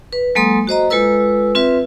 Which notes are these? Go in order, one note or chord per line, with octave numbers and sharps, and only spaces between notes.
B4
F#3 G#3 A#3 A4 C6 D#6
F#4 C5 D#5 A#5
G#3 F4 A4 B4 E6
C4 F4 B4 E5